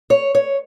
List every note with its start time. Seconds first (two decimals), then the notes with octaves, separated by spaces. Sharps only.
0.10 C#5
0.35 C#5